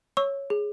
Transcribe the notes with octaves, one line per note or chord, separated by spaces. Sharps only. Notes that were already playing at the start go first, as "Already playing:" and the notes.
C#5 C#6 E6
G#4